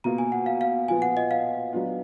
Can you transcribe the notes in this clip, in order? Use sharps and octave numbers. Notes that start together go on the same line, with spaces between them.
B2 A#3 F4 A#5
G#5
F#5
F5
F5
A#2 F3 B3 G#5
F#5
D#5
F5
F#3 B3 D4 F4